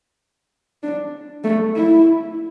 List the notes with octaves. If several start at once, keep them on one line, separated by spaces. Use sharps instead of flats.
D4
A3
E4